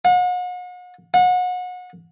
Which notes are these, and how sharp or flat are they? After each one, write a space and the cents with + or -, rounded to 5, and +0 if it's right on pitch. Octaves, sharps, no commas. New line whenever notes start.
F#5 -40
F#5 -30